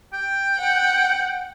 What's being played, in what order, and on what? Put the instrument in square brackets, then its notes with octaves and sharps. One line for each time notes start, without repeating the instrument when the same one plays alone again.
[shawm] G5
[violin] F#5